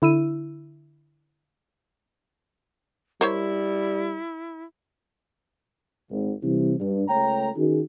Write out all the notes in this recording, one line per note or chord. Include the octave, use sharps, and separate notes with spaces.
D3 E4 E6 D#7
G3 E4 A#4 C5 C#5
G#1
C3 E3 G3 E4
G2
C#2 A3 C#5 G5 A#5
D#3 C#4 F#4 G#4